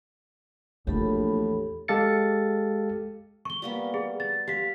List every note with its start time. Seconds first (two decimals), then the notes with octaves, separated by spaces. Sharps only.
0.87 A#1 E2 A2 G4 A4 B5
1.88 G#3 G4 A4 F5 A6 C#7
3.45 C#6 G7
3.62 G3 A#3 B3
3.94 G#4
4.20 A6
4.48 G4 F5 B6